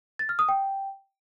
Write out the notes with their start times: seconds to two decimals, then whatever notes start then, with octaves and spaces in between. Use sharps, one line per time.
0.19 A6
0.29 F6
0.39 D#6
0.49 G5